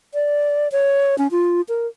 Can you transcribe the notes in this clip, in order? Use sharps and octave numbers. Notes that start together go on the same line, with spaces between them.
D5
C#5
C#4
F4
A#4